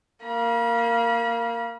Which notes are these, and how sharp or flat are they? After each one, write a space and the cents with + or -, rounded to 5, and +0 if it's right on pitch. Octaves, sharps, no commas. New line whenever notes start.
A#3 -10 B5 -45